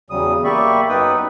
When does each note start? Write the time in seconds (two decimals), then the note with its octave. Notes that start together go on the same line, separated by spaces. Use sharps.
0.10 E2 C#3 F#3 G3 D#6
0.44 A#3 G4 D5 E5 B5 C#6
0.89 F#2 B3 D#4 B4 G5 D#6